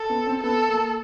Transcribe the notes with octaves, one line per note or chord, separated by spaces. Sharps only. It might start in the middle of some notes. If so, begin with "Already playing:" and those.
Already playing: A4
B3
C4
B3 A4
A#3